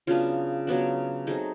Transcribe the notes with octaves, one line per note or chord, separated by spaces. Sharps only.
C#3 F#3 B3 D4 F4
C#3 F#3 B3 D4
F#3 A3 C4 D#4 G#4